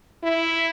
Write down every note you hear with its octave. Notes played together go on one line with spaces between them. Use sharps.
E4